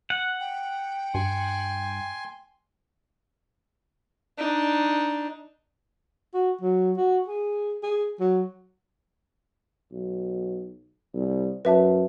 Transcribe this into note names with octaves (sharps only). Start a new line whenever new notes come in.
F#5
G5
G2 G#5 C6
D4 D#4
F#4
F#3
F#4
G#4
G#4
F#3
B1
C2
F#2 B4 E5 A5